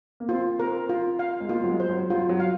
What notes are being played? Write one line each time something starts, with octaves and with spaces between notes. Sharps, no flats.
A#3
C4 F4
C4 A#4
F4
F5
G#3
A#3 F4
F#3
G#3
C5
F#3
F#3 F4
F#3
F5